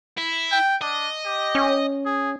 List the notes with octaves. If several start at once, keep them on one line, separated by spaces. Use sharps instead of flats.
E4
G5
D4 D#5
G4
C#4
G#4